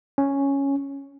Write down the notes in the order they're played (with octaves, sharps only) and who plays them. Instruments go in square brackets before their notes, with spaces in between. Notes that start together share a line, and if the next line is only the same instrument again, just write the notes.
[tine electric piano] C#4